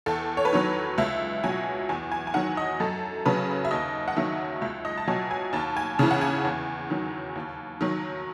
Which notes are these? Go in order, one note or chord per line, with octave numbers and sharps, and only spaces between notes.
E2 A4
C#5
B4
D#3 F#3 C#5
C#2 E5
B2 F#3 G#5
E2 G#5
G#5
G#5
D#3 F#3 F#5
D#5
F#2 A4
C#3 F#3 B4
E5
D#2 D#5
F#5
D#3 F#3 E5
C#2 E5
D#5
A5
B2 F#3 G#5
G#5
D#2 A5
G#5
C#3 E3 A5
F#5
G#5
E2
D#3 F#3
D#2
D#3 F#3